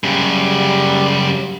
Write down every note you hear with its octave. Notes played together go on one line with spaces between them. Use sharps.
F#2 C#3 G3